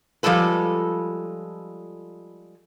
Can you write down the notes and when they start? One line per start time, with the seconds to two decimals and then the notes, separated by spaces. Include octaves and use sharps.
0.23 F3 G3 G#3 A4 B4